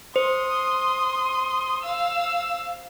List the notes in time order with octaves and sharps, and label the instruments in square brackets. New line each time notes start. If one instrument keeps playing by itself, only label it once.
[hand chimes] C5 [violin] C6 D#6
[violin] F5 E6